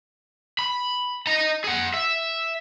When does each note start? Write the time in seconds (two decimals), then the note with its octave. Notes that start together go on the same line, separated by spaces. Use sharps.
0.59 B5
1.27 D#5 A#5
1.64 G#4 F#5
1.94 E5